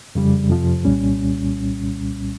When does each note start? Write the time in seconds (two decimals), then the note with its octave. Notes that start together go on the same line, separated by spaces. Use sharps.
0.15 F2 C#3 G3
0.49 F2 C3 F3
0.85 C2 A#2 G3 C#4